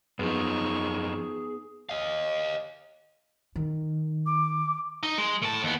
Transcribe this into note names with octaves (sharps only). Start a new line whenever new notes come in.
F#2 F3 B3 D#4 G#4 C#6
D#5 F5
D#3
D6
D#4
G#3
A2 A5
D#2 B3